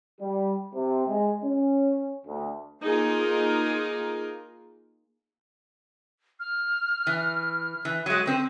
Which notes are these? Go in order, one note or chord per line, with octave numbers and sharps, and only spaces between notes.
G3
C3
G#3
C#4
D2
A#3 D#4 F4 G#4 A#4
F6
E3
E3
F#3 G#3 D#7
D3 C4 C5